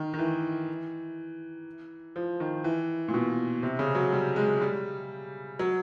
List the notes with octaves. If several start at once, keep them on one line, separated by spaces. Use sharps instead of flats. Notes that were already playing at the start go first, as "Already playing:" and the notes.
Already playing: D#3
D#3
E3
F3
D#3
E3
A#2
B2
C3
C#3
F#3
G3
G#3
G3
F#3